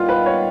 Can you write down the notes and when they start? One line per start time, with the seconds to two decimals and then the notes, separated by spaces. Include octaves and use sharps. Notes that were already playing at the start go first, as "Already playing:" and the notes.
Already playing: A#2 G3 B3 D#4 F4
0.09 B4
0.26 C#5